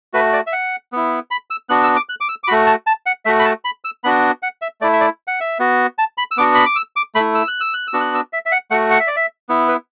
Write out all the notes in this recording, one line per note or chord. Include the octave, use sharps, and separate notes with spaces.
A3 F#4 B4
D5
E5
F#5
B3 E4
B5
E6
B3 D4 F#4 F#6
E6
D6
F#6
D6
E6
D6
A3 F#4 B5
A5
A5
F#5
A3 F#4 E5
B5
A5
B5
E6
B3 D4 F#4 B5
F#5
E5
A3 E4 D5
E5
D5
F#5
E5
B3 F#4
A5
B5
E6
B3 D4 F#4 D6
B5
D6
E6
D6
A3 B5
E4
E6
F#6
E6
F#6
E6
B3 D4 F#4
F#6
E6
E5
E5
F#5
A3 F#4 F#5
F#5
E5
D5
E5
B3 E4
B4